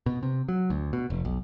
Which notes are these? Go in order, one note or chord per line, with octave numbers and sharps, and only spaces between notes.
B2
C3
F#3
D2
B2
F1
B1